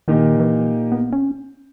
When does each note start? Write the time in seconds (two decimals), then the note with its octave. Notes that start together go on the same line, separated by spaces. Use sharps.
0.08 A#2 D#3 A#3 D#4 G4
0.39 E3
0.92 B3
1.13 C#4